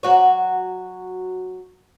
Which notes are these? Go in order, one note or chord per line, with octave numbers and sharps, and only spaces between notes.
F#3 F#4 C#5